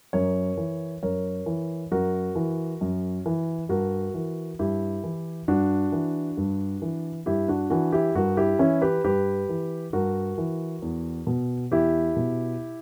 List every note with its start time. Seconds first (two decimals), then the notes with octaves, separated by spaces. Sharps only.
0.13 F#2 A#4 C#5
0.57 E3
1.03 F#2 A#4 C#5
1.46 E3
1.92 F#2 F#4 A#4
2.36 E3
2.81 F#2
3.26 E3
3.69 G2 F#4 A#4
4.14 E3
4.59 G2 E4 G4
5.04 E3
5.48 G2 D4 F#4
5.92 E3
6.37 G2
6.82 E3
7.26 G2 E4 G4
7.48 D4 F#4
7.70 E3 D4 F#4
7.92 E4 G4
8.15 G2 F#4 A#4
8.37 E4 G4
8.59 E3 C#4 E4
8.82 G4 B4
9.04 G2 G4 B4
9.49 E3
9.93 G2 F#4 A#4
10.38 E3
10.82 E2
11.27 B2
11.71 E2 E4 G4
12.16 B2